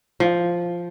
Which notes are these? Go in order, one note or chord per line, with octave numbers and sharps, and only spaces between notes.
F3